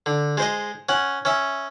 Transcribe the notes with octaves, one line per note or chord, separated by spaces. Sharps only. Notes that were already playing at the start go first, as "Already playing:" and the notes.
D3
G#3 C5 D#5
C#4 F#5
C#4 E5